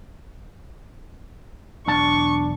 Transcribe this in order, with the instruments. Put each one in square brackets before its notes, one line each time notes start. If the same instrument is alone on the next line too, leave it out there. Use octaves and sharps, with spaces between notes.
[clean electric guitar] B1 E2 A5 [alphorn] D4 [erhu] C#6